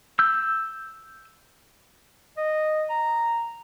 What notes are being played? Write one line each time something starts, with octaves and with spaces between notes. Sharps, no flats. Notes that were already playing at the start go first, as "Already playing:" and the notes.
E6 G6
D#5
A#5